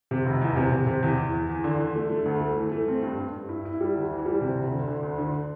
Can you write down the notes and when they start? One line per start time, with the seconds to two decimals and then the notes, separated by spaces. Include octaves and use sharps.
0.11 C3
0.26 F1
0.41 E2
0.56 C3
0.72 C3
0.87 C3
1.03 E2
1.18 E2
1.34 E2
1.49 E2
1.64 D3
1.80 D3
1.95 A3
2.10 A3
2.25 D2
2.41 A3
2.57 E3
2.72 A3
2.88 C4
3.03 G2
3.19 G2
3.34 G2
3.49 E4
3.65 E4
3.81 G3
3.95 D2
4.11 E3
4.26 G3
4.41 C3
4.56 D2
4.72 D3
4.88 D3
5.03 D2
5.18 D3